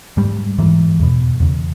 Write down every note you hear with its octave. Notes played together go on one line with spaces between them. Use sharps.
G#2 G3
G#2 E3
E2 B2
E2 C#3